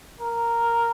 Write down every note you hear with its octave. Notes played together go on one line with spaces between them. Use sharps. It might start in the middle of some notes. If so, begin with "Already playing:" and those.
A#4